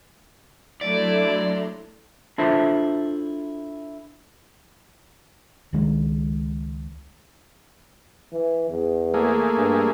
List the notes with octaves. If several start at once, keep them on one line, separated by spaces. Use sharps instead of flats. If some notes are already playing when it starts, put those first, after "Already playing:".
F#3 A3 D4 E4 D5 A#5 C6
D4 E4 F4 A4 C5 E5
C#2 D#3 G#3 C#4
E3
E2
A3 A#3 G#4
G2